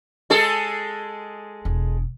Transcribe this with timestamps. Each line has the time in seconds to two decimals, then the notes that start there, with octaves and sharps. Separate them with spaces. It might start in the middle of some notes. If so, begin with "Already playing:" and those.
0.30 G#3 G#4 A4
1.65 E1